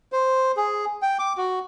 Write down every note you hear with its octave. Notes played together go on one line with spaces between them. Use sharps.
C5
G#4
G5
D6
F#4